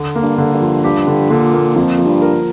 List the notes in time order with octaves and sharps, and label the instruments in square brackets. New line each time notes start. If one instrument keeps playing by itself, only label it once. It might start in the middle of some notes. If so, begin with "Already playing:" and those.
Already playing: [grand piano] D3
A#3
[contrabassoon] G2
[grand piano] D3
[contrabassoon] G2
[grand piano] F3
[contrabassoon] G2 [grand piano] G4
[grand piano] D3
[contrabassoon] A#2 [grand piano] D3
[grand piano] A#3
[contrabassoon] F2 [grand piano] F3
[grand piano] F3
[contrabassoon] G2
[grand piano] A#4